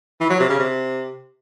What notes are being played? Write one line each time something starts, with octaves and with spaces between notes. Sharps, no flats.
E3
F#3
C3
C#3
C3